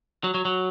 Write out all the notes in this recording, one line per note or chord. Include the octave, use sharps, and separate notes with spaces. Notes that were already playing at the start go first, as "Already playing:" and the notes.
F#3
F#3
F#3